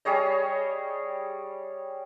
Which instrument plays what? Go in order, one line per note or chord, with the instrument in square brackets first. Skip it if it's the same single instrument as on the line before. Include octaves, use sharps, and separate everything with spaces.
[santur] G3 G#4 C#5 D#5